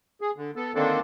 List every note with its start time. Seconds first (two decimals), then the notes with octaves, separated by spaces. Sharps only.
0.21 G#4
0.37 D3
0.56 B3 A4
0.75 D3 D#3 A#3 C4 D4 A4